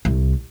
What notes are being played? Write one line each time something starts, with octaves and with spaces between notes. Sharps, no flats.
C2